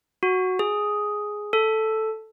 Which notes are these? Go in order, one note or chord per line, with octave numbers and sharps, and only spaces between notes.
F#4
G#4
A4